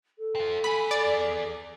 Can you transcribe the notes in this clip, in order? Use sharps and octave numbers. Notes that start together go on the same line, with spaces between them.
A4
C4 F4
B3 G#4 B5
D5